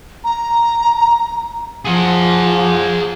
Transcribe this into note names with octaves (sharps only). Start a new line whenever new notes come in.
A#5
F3 G#4 F#5